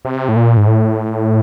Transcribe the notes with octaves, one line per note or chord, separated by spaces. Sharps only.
C3
A2
A#2
G#2
A2